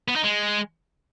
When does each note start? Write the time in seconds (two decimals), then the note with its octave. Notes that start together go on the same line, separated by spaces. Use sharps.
0.08 B3
0.16 D#4
0.24 G#3